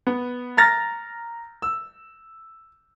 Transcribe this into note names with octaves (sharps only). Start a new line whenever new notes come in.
B3
A#5 F6 A6 A#6
E6